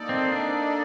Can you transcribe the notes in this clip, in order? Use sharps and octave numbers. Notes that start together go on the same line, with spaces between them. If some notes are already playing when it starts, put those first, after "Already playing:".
Already playing: A#3 D#4 A4 D5
C4
D4